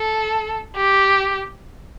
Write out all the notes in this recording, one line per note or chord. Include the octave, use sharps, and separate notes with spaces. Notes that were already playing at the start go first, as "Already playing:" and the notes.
Already playing: A4
G4